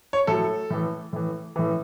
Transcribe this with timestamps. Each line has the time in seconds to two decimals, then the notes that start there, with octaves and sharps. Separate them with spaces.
0.13 C#5
0.27 A2 F#3 A4
0.70 A2 E3
1.13 A2 E3
1.56 A2 E3